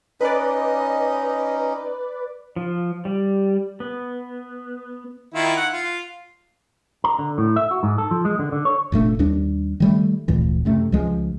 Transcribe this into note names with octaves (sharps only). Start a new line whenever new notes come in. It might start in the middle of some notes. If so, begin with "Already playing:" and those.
C#4 D#4 B4 D5 D#5
F3
G3
B3
D#3 E4 F4
F#5
F4
A#5
D3
A2
E5
F#4
G#2
A4
F3
G#3
D3
D3
C#5
F1 A#2 A3 D4
D#2 G3 D4
D#3 G3 A3
F1 D2 A#2 E3
F#2 C3 A3
C#2 F3 G#3